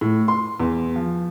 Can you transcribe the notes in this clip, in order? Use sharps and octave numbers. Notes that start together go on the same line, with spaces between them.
A2
C6
E2
F3